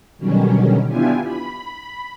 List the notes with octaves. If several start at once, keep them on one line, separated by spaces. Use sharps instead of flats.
B2 D3 D#3 F#3 G3 C#4
B3 D4 E4 F4 G4 G#5
B5